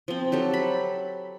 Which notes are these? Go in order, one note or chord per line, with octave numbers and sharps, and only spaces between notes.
F3 C4
F#3 G4 A4
B5